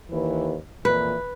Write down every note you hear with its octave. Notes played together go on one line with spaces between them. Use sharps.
D#2 E3 B4
F2 A#2 E3 B4